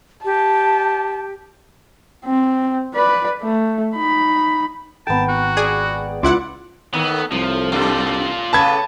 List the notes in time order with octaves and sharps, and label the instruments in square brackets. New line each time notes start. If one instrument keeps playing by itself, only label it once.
[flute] G4 [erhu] A5
[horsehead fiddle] C4
B4 D5
A3
D#4 B5
[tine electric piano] G#1 G5 [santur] B3 A#4 [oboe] A5
[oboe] F#4
[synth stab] G#4 [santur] D5
[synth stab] C#2 E4 F#5 [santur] F4 D5 [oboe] D6
[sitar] A2 D#3 [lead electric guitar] B3
[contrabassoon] C2 [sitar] A2 [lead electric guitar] F3
[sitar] F#2 [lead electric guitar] F4 D5
[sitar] A2 C#3 B3 [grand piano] A5 B5 G#6